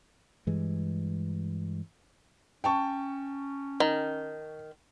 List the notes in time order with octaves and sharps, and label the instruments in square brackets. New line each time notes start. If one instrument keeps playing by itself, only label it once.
[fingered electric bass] G2 E3 G#3
[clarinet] C#4 [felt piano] G5 A5 C#6
[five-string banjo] D#3